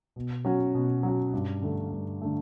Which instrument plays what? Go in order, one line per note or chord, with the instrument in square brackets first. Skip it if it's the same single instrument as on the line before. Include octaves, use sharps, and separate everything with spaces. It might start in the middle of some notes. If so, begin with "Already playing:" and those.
[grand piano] B2
F#3 C#4 F#4
B2
F#3 C#4 F#4
G2
D3 A3
G2
D3 A3